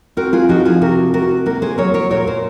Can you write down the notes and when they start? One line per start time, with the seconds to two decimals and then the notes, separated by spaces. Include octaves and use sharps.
0.17 C4 F#4 A#4
0.33 F4 G#4
0.49 F3 D#4 F#4
0.65 F4 G#4
0.81 C3 F#4 A#4
1.14 C3 F#4 A#4
1.46 A#3 F#4 A#4
1.62 G#4 C5
1.78 F#3 A#4 C#5
1.94 A#4 C#5
2.10 A#2 A#4 C#5
2.27 G#4 C5